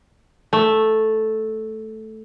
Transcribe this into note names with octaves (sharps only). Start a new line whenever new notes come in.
A3